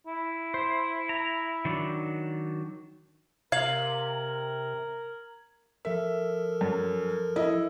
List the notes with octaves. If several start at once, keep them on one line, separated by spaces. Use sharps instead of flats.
E4
C5
A#5
D#3 F#3 D4
C3 A#4 F5 G#6 F#7
F3 A4 A#4 E5
F#2
E4 D#5